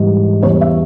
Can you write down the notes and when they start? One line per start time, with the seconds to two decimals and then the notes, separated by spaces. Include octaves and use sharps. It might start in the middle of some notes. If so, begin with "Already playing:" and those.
Already playing: G#2 E3 G3
0.43 E2 E3 G3 C#5
0.61 E5